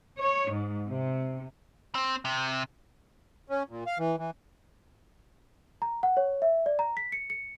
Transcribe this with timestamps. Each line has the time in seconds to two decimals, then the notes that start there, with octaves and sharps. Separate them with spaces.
0.21 C#5
0.52 G#2
0.87 C3
1.95 C4
2.25 C3
3.50 C#4
3.70 A#2
3.87 F5
3.99 E3
4.18 E3
5.82 A#5
6.03 F#5
6.17 C#5
6.42 E5
6.66 D5
6.79 A#5
6.97 B6
7.12 C#7
7.30 C#7